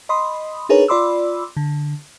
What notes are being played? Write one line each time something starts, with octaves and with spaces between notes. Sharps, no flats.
D#5 B5 C6 D#6
D4 D#4 G#4 A#4 B4 C#5
F4 D5 B5 C6 D6 E6
D3